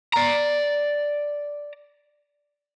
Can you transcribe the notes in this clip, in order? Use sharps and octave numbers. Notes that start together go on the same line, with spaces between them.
D5 A#5